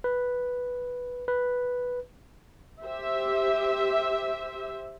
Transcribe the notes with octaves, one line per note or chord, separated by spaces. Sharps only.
B4
B4
G4 C5 E5